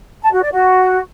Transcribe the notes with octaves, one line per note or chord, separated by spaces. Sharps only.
A5
F#4
D5
F#4